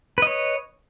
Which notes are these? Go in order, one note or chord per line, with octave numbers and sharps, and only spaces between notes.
B4 C#5 D#5